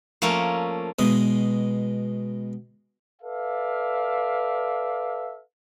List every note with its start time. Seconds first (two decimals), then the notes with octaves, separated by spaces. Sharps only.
0.22 F3 A3 A#3 C#4 A#4
0.99 B2 G#3 D#6
3.22 A4 B4 D5 E5 F5